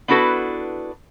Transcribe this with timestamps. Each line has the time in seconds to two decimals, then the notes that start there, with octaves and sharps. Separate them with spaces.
0.08 B3 D4 E4 F#4 A4 B4